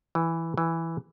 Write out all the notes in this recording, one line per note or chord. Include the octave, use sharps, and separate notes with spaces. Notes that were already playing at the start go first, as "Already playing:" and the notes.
E3
E3